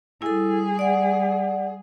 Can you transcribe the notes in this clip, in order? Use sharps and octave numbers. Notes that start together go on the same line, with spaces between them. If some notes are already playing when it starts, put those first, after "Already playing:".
G3 E4 G#4 A4
D5 F#5